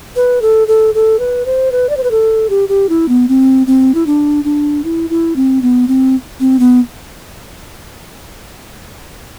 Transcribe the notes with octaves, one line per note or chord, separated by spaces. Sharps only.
B4
A4
A4
A4
B4
C5
B4
D5
C5
B4
A4
G4
G4
E4
B3
C4
C4
E4
D4
D4
E4
E4
C4
B3
C4
C4
B3